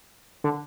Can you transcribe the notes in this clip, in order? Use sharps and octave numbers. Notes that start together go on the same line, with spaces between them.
D3